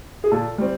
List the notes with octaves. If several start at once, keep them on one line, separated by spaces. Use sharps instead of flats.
G#4
A#2 A4
G3 C4